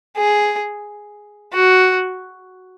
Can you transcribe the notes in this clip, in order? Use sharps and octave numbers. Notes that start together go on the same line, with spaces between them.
G#4
F#4